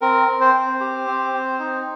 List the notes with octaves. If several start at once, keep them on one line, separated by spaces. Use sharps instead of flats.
C4 A#4
C4
C5
C4
G4
C4
C4
D#4